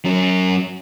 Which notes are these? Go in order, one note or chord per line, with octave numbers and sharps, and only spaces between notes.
F#3 C#4